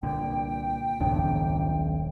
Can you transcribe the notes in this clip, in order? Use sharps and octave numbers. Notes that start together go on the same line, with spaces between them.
C2 A#2 D3 G5
D#1 B1 G#2 C#3 F3 D4